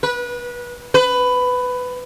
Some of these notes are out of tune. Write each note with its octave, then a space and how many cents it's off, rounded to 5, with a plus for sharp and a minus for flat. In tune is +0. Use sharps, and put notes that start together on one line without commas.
B4 -25
B4 +15